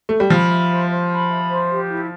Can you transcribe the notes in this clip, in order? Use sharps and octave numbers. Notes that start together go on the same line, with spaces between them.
A3
G3
F3 B5
E5
C5
C5
B5
E5
C5
G4
E4